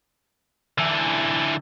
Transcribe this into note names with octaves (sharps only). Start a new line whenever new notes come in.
D3 E3